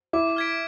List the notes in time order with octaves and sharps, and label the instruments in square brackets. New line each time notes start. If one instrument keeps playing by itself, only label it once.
[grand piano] E4 [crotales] D6
[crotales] F6 G#6 B6 D7